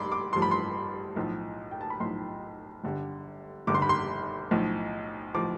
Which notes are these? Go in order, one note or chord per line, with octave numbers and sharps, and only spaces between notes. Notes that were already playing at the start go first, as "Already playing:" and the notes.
Already playing: A1 G2 B5 C6 D6
D6
A1 G2 F3 C6
B5
C6
B1 A2 F3
G5
A5
B5
B1 A2 F3 C6
G1 G2 D3 G3
G1 G2 D3 G3 D6
C6
B5
C6
B1 A2 F3
A2 F3 D6